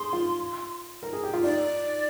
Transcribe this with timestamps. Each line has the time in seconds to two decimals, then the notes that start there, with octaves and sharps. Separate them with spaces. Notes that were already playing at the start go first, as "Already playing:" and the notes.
Already playing: G#4 C6
0.13 F4
1.03 A#4
1.13 G#4
1.23 G4
1.34 F4
1.43 D#4 D5